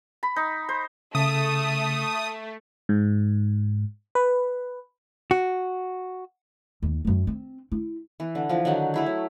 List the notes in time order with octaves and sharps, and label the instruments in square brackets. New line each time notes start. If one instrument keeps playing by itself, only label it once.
[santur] B5
D#4
C5
[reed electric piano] C#3 [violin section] A3 [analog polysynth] D#6
[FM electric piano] G#2
B4
[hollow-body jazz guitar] F#4
[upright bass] D#2
F#2 F#3
C4
E4
[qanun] E3
D3
E3 F3
D3 D#3 F#3 D#4
A3 E4 G#4
F#3